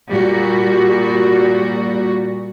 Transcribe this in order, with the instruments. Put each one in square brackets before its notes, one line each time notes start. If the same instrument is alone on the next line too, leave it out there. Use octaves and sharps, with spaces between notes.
[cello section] A#2 G3 F#4